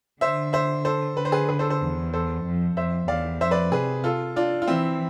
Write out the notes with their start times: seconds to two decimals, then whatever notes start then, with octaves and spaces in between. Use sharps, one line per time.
0.21 D3 C5 E5
0.53 C5 E5
0.85 A4 C5
1.17 D3 B4
1.25 C5
1.32 G#4 B4
1.49 G#4 B4
1.59 A4 C5
1.70 A4 C5
1.81 E2
2.13 A4 C5
2.45 F2
2.77 F2 C5 E5
3.08 E2 D5 F5
3.40 F2 C5 E5
3.51 B4 D5
3.72 C3 G#4 B4
4.04 F4 A4
4.36 D4 F4
4.62 F4
4.68 E3 C4 E4